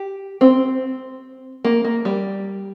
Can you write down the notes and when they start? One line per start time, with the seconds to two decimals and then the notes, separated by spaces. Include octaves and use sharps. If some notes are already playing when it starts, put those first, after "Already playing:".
Already playing: G4
0.41 C4
1.65 A#3
1.85 A#3
2.05 G3